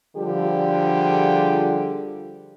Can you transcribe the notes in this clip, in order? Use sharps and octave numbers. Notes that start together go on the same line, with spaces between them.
D3 F3 G3 F4 G4 G#4